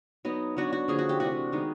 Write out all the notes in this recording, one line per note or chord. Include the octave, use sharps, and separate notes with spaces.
F#3 B3 D#4
F#3 B3 D4 F#4
F#4
D3 F3 A#3 C#4 G#4
F#4
G4
C3 E3 A3 D4 F#4
D#3 G#3 B3 D#4